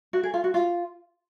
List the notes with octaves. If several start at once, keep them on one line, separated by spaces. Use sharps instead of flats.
F#4
G#4
F4
F#4
F4